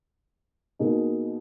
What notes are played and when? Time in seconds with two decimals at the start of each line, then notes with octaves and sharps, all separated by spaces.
0.79 B2 A#3 D#4 G#4